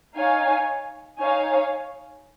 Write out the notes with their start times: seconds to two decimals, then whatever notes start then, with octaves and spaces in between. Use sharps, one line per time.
0.17 D#4 C#5 F5 G#5
1.21 D#4 C#5 F5 G#5